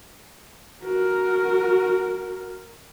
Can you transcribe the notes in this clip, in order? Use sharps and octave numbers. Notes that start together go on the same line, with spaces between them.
F#4 A#4